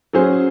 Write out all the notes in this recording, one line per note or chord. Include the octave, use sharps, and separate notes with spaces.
F#3 C#4 G#4 C5